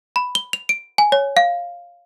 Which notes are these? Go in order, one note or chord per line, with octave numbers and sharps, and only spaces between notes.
B5
G7
F7
D7
G#5
C#5
F5